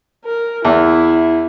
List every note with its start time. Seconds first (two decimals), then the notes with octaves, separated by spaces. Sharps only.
0.25 A#4
0.65 E2 E4